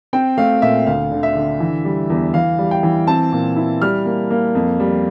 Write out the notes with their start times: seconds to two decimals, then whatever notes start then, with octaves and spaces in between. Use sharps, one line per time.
0.13 C4 G5
0.37 A3 F5
0.62 A#2 E5
0.86 D2 F5
1.11 D3
1.23 E5
1.35 D3
1.60 E3
1.85 G3
2.10 E2
2.34 E3 F5
2.59 G3
2.71 G5
2.83 E3
3.07 C4 A5
3.32 A#2
3.56 E4
3.82 G3 F6
4.06 A#3
4.31 A#3
4.55 F2
4.80 G3